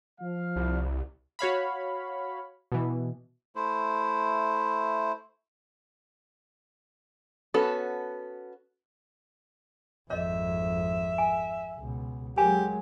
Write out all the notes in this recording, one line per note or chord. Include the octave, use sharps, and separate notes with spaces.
F3 F5
C2
F#4 C#5 F5 B5
B2 E3
A3 E4 C5
B3 C#4 F#4 A4 A5
G#1 F2 C#5 D#5 E5
G#5
C#2 B2
F#3 G#3 G4 A#4 G#5